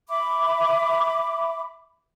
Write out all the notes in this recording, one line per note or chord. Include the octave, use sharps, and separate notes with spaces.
E5 B5 D6